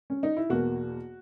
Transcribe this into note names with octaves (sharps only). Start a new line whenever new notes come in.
C#4
D#4
E4
E2 B2 A#3 F#4